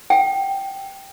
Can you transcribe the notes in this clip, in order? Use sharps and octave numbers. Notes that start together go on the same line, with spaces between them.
G5